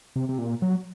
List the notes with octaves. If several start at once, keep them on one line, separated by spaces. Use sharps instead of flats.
C3
C3
A#2
F#3